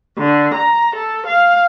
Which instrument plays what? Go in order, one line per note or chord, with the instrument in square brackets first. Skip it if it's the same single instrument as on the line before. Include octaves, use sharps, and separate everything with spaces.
[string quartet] D3
A#5
A4
F5